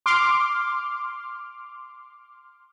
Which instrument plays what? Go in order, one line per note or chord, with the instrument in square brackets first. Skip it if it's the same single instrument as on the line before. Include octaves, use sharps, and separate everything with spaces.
[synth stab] C6 D6 F6